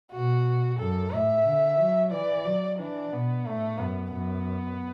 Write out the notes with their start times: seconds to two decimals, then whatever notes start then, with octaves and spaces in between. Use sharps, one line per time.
0.12 B2 F#4
0.79 F#2 A4
1.12 A2 E5
1.46 D3
1.79 F#3
2.12 E3 D5
2.45 F#3
2.79 E3 D4
3.12 B2 B3
3.45 A2 A3
3.78 F#2 B3
4.12 F#2 B3